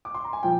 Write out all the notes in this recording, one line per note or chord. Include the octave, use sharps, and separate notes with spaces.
D6
C6
A#5
G#5
A#2 F3 G5